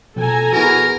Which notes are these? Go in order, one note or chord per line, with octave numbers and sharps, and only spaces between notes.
B2 F3 A4 G#5 A#5
B3 E4 F#4 G#4 A#4 B4